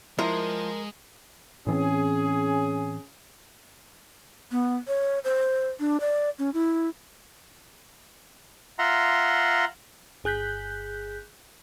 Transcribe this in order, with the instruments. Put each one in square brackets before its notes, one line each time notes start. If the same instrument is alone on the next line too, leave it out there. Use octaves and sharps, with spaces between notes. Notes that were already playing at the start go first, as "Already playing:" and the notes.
[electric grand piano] F3 C6 [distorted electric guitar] G#3 [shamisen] E4 [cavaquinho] A#4
[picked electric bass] A2 E3 C4 [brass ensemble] C#4 G#4
[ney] B3
C#5
C5
D4
D5
C#4
E4
[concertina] F4 E5 F#5 A#5 C6
[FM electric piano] G1 G#4 F#6 G6 B6